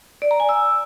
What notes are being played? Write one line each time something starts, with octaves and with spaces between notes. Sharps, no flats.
D5
A#5
G#5
E6